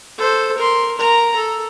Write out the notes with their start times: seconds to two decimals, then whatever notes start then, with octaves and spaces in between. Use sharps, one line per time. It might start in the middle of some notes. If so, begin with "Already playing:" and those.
0.18 A4 C5
0.57 A#4 C6
0.98 A#4 A#5
1.36 A4